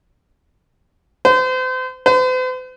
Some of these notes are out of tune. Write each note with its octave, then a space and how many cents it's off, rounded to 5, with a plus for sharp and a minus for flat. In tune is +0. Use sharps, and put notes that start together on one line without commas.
C5 -35
C5 -45